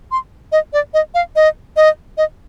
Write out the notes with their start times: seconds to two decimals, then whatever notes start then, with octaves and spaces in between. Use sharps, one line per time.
0.12 C6
0.52 D#5
0.73 D5
0.94 D#5
1.14 F5
1.36 D#5
1.76 D#5
2.17 D#5